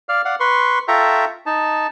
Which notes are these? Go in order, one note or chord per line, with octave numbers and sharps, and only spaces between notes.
D5 F5 F6
D5 F5 F#5
B4 C6 C#6
F4 A4 E5 G5 A#5 C#6
D#4 A5